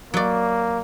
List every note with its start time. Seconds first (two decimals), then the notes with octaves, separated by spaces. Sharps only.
0.14 F#3 A#3 D5